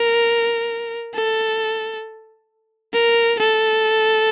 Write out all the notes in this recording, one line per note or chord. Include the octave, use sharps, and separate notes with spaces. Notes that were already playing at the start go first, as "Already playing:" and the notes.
Already playing: A#4
A4
A#4
A4